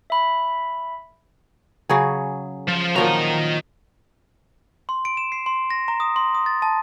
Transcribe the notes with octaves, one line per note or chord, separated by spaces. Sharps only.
E5 B5
C#3 F#3 G#4
F3
A#2 D#3 F3 F#3 A#5
C6
D7
E7
C7
C6
A#6
A#5
D#6
C6
D#6
A6
A5